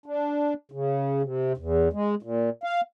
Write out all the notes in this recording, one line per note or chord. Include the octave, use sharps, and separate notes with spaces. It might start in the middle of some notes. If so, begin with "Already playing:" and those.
D4
C#3
C3
E2
G#3
A#2
F5